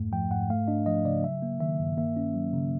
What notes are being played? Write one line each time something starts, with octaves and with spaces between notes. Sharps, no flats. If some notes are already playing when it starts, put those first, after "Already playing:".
Already playing: F2 G#2 A3
F3 G5
G#2 F#5
A3 F5
D4 D#5
F3 D#5
C#3 D5
F#3 E5
A#3
D#3 E5
G2
A#3 E5
C#4
F#3
C#3